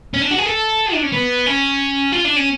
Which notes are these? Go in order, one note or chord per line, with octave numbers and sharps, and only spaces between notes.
C#4
D4
F#4
G#4
A4
D4
C#4
B3
C#4
F4
D4
C#4